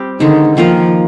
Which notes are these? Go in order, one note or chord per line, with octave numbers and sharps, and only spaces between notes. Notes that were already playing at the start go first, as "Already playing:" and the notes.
Already playing: G3 C4 G4
D3 D#3 G#3 D#4
D#3 F3 A#3 F4 A#4